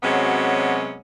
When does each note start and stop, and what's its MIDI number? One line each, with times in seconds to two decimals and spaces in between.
0.03 0.96 48
0.03 0.96 54
0.03 0.96 56
0.03 0.96 59
0.03 0.96 61
0.03 0.96 66